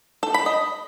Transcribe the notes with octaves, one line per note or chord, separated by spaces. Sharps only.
A4
B5
D#5